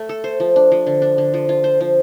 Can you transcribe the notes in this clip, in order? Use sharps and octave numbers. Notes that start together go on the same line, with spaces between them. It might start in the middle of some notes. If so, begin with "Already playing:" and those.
Already playing: A3
A4
C5
F3
D4
F3
D3
D4
D3
F3
F4
C5
F3